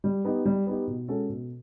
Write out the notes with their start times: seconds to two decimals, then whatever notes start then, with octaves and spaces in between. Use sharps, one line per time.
0.04 G3
0.25 B3 D#4 G4
0.46 G3
0.67 B3 D#4 G4
0.87 B2
1.08 G#3 C#4 F#4 A4
1.29 B2